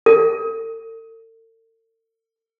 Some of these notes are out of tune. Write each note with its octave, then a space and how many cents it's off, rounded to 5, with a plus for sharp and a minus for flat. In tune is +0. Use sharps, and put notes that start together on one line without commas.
A4 +45